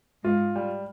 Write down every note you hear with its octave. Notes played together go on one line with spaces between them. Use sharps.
G#2 G#3 F4
G3